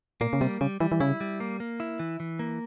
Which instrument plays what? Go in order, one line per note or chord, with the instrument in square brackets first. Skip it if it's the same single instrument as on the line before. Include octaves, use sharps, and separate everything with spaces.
[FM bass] A#2 [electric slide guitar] A#3
[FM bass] C#3
[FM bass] C3 [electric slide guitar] G3
[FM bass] C#3 [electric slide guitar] G3
[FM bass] E3 [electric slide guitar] G3
[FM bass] E3
[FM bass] C#3 [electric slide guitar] E4
[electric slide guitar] G3
A#3
A#3
E4
E3
E3
A#3